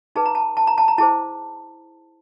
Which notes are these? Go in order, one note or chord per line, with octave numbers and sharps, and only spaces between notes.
D#4 G#4 B4 A5
A#5
A5
A5
A#5
A5
A#5
E4 G#4 C5 A5